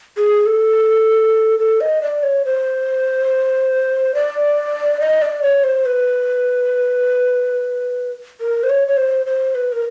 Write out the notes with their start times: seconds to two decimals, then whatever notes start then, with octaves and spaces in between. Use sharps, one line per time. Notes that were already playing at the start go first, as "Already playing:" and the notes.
0.17 G#4
0.46 A4
1.59 A4
1.81 D#5
2.02 D5
2.23 C#5
2.45 C5
4.14 D5
5.00 D#5
5.22 D5
5.42 C#5
5.63 C5
5.86 B4
8.41 A#4
8.63 C5
8.69 C#5
8.88 C#5
8.97 C5
9.26 C5
9.55 B4
9.72 A#4